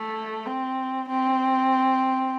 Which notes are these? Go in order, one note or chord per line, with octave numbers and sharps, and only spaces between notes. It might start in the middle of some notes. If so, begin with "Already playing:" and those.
Already playing: A3
C4
C4